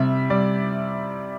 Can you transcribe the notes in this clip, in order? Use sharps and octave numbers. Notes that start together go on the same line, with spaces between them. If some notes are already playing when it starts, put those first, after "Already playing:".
Already playing: C3 G3 E5
G3 D5